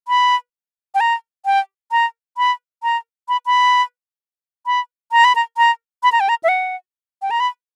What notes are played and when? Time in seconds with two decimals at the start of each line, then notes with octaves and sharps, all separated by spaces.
0.08 B5
0.95 G5
1.00 A#5
1.45 G5
1.91 A#5
2.38 B5
2.83 A#5
3.29 B5
3.46 B5
4.66 B5
5.12 A#5
5.24 B5
5.36 A#5
5.57 A#5
6.03 B5
6.12 A#5
6.20 G5
6.29 A#5
6.44 E5
6.48 F#5
7.22 G5
7.31 A#5
7.40 B5